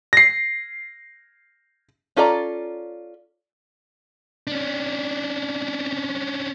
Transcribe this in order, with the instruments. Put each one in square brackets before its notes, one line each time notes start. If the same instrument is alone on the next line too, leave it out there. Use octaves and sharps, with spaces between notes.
[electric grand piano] A#6 C7
[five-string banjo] C#4 F4 A4 D5 A#5
[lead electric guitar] C#4 D4